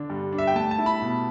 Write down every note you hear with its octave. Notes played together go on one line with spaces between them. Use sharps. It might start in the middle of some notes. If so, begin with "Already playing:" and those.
Already playing: D3 D4
G2
D4
E5
G5
A3 A5
A5
E4
B5
B2